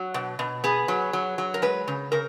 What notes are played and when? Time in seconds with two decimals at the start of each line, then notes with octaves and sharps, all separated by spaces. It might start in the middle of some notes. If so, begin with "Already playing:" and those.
Already playing: F#3 F#4
0.14 B2
0.39 B2
0.64 B3 G#4
0.88 F#3
1.13 F#3
1.38 F#3
1.54 A#4
1.62 G#3 B4
1.88 C#3
2.12 C#3 A#4